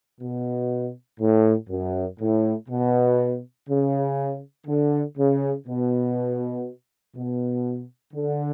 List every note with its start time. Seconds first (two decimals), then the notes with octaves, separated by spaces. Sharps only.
0.20 B2
1.19 A2
1.69 F#2
2.19 A2
2.68 B2
3.68 C#3
4.66 D3
5.17 C#3
5.66 B2
7.14 B2
8.14 D3